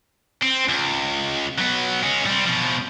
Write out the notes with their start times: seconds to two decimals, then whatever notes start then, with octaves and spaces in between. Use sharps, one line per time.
0.43 C4
0.69 C#2
1.58 F#3 B3
2.03 G#3 C#4
2.26 G3 C4
2.44 B2 F3